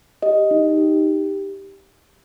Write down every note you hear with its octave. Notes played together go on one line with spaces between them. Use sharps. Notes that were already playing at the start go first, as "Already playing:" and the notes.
G4 D#5
D#4
G4